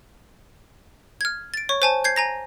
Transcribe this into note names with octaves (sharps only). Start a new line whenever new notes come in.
F6 G#6
A6 D7
C#5 C#6
C5 G#5 A5
G6 G#6 C7
G#5 A#5 A#6